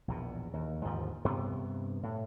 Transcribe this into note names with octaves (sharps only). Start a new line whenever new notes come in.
A#1 E2 B2
D#2
D#2 G#2 D3 F3
G2 C3 B3
A2